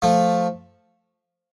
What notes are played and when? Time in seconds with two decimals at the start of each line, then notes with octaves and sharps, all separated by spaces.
0.02 F3 A3